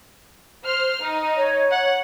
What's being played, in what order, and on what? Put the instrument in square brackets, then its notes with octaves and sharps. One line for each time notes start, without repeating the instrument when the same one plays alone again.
[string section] C5 F6
D#4
[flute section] C#5
[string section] F#5